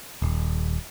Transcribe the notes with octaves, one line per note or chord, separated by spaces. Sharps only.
D#1